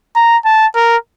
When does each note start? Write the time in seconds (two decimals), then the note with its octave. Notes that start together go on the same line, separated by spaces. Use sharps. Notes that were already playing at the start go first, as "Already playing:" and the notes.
0.16 A#5
0.45 A5
0.75 A#4